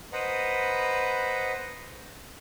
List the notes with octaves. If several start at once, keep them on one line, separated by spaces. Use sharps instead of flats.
B4 C5 D#5 F#5 A#5 B5